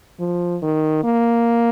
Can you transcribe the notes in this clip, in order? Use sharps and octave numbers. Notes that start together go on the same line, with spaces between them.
F3
D#3
A#3